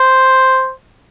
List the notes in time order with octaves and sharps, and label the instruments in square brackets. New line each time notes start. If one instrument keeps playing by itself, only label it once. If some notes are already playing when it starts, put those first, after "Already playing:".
Already playing: [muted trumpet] C5